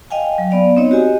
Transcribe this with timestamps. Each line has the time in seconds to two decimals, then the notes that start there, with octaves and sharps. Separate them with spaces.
0.11 D#5 F5 G5 G#5
0.38 F#3
0.51 B3 D5 F5
0.77 C4 D#4 C#5 D#5
0.91 F#4 G4 D#5 G#5